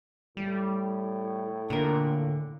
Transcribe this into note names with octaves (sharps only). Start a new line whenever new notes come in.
A2 G3
A#2 D3 A#4